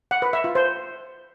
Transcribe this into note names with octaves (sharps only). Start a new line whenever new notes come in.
F#5
B4
E5
F4
C5